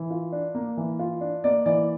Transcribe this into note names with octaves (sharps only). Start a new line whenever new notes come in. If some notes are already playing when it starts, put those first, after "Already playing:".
Already playing: E3
F4
D4
A#3
E3
F4
D4
A#3 D5
E3 D5